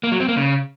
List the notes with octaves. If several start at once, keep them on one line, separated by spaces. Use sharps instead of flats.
A#3
F#3
C4
A#3
C#3